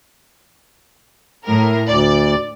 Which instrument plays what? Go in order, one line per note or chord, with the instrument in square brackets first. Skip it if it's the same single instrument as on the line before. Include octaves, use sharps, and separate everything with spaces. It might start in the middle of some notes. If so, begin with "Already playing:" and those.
[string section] A2 A#4
[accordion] D2 [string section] D5